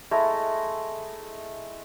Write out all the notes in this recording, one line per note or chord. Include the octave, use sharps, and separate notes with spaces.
G#3 A3 E4 A#5